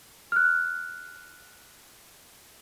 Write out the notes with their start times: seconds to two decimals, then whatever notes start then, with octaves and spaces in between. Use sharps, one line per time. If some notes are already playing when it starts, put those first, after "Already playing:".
0.32 F6 F#6